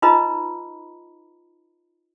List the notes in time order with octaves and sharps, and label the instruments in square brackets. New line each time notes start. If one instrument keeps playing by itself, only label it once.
[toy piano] D#4 F4 B4 D#5 A#5 B5